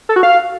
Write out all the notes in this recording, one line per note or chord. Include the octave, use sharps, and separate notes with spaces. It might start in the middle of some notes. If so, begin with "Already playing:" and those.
A4
F#4
F5